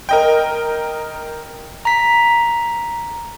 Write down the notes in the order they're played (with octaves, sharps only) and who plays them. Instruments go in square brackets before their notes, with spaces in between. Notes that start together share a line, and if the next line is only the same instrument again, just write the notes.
[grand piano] A#4 D#5 G5
[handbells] A#5 B6